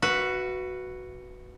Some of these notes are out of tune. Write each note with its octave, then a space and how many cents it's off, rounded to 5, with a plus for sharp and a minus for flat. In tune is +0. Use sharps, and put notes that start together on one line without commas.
F#4 +0 B4 +0 E5 +45